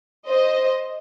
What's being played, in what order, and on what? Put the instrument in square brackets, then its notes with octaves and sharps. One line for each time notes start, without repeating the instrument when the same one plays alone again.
[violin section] C5 D#5